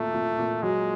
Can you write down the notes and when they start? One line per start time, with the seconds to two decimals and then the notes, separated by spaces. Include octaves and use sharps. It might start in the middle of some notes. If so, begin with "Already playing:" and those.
Already playing: A#2 A3 A#3
0.14 A#2
0.39 A#2
0.62 F#3 G#3